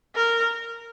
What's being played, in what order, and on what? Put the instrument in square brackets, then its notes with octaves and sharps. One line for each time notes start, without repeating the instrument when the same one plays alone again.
[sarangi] A#4